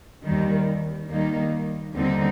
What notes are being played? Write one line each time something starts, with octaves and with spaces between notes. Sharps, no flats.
D#2 D#3 G3
D#2 D#3 G3 A#3 D#4
D#2 D3 G3 C4 D#4